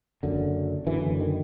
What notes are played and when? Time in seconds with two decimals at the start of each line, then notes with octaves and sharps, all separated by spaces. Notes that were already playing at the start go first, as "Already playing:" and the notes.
0.23 F#1 F#2 D3
0.87 F#1 F#2 D3 E3
1.20 D#3